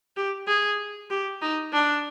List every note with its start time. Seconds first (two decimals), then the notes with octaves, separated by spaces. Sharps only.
0.16 G4
0.47 G#4
1.10 G4
1.42 D#4
1.73 D4